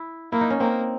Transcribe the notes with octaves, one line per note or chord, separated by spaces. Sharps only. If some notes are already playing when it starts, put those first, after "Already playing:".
Already playing: E4
A#3 E4
D#4
C#4
A#3 C4